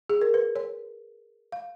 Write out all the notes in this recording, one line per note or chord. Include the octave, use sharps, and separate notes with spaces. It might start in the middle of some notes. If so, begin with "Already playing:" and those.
G#4
A#4
B4
C#5
F5